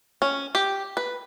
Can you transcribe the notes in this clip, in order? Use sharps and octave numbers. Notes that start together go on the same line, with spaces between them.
C#4
G4
B4